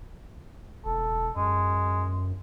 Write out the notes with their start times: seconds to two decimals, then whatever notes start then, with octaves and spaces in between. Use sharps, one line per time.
0.85 E1 A4
1.36 F#2 G#3